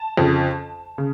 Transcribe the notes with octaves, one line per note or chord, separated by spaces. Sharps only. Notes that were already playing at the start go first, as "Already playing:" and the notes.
Already playing: A5
F2 C#3 F3
C#3